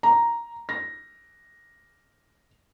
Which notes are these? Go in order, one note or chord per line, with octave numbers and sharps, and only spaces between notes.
A#5
A#6